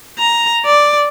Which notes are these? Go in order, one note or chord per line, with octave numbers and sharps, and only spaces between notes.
A#5
D5